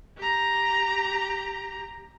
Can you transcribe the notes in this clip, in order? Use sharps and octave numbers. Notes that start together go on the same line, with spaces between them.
G4 A#5